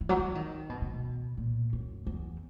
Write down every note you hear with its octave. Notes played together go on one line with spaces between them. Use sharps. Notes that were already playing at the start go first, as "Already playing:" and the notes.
E3
F#3
E3
D#3
B2
C#3
B2
A#2
F#2
E2